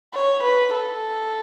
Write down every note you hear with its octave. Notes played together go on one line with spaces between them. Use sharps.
C#5
B4
A4